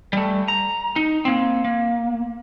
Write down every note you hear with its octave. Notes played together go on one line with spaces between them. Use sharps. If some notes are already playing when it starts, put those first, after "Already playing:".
G3 A3
A#5
D#4
A#3 C4
A#3